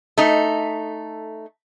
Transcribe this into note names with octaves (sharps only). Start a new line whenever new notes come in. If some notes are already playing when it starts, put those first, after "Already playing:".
A3 D#4